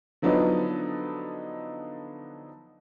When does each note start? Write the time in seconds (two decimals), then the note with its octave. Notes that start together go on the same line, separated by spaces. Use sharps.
0.22 D3 F3 F#3 B3 D4 D#4